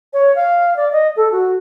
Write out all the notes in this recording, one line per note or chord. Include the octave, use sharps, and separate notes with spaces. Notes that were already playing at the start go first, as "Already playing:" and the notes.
C#5
F5
D5
D#5
A4
F#4